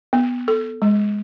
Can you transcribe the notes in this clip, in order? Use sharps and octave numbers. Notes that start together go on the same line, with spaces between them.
B3
A4
G#3